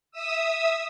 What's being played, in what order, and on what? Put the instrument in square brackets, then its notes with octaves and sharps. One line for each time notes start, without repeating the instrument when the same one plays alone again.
[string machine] E5 D#6 E6